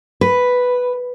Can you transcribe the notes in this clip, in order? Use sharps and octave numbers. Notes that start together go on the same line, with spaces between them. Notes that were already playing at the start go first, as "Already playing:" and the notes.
B4